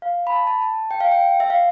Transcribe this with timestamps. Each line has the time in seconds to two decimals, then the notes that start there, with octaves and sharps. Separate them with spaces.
0.02 F5
0.27 B5
0.32 A5
0.47 A5
0.62 A5
0.91 G5
1.01 F5
1.12 G5
1.40 E5
1.50 F5